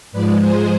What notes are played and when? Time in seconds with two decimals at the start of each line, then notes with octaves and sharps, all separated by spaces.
0.12 G#2 F3 G#3 B4 D5
0.40 G#4 C5